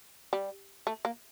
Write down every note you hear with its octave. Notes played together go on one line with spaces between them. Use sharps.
G3
A3
A#3